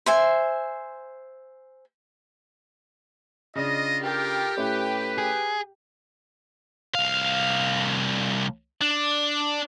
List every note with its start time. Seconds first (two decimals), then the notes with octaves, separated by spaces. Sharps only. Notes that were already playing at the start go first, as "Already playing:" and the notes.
0.06 C5 E5 G#5
3.55 C#3 D4 F4 D#5
4.03 F4 G4 A4 A#4
4.57 A2 A3 C#4 B4
5.18 G#4
6.95 C2 F5
8.81 D4